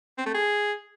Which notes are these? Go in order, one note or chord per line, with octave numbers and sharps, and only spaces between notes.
C4
A3
G#4